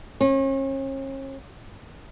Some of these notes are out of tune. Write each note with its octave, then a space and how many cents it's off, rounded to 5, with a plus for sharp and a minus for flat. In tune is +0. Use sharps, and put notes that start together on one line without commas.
C#4 -40